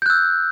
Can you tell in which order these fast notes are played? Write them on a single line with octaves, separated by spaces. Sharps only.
G6 F#6 E6